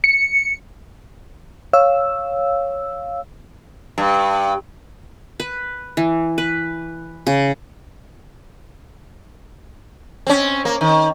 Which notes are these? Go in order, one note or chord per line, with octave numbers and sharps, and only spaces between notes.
C#7
C#5 F5 E6
G2
B4
E3
B4
C#3
C4 C#4
A#3
D#3